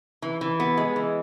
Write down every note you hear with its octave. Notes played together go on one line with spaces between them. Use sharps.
E3
E3
B3
G#3
E3